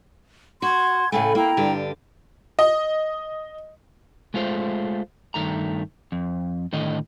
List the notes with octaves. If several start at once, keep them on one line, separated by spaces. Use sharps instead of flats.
F#4 C6 G#6
A2 C#3 A3 G5 G#5 B5
A#3 E4 G5 A#5
G2 D3 G4
D#5
G#3 A3 F4 C5
G2 D#3 A3 A#5
F2
A2 D3 D#3 D#5